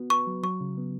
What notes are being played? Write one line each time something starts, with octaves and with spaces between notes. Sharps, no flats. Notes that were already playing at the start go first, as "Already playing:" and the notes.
Already playing: B3 F#4
B4 C#6
F#3
F#3 C#6
C#3
B3